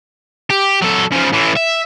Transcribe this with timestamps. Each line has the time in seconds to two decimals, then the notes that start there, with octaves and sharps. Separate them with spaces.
0.50 G4
0.82 F#3 A4
1.12 C#3 F3
1.33 A2 E3
1.56 E5